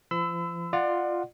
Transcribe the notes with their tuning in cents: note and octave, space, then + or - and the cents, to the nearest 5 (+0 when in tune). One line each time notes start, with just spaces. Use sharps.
F3 -35 B5 +45 E6 +0
F4 +0 D5 +30 F#5 -5